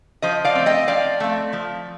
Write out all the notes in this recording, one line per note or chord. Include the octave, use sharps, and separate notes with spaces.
F3 C5 D#5
D5 F5
A3 C4
D#5 G5
F3 D5 F5
A3 C4
F3